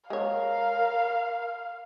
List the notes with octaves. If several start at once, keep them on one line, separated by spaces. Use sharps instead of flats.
G#3 A#4 C#5 F5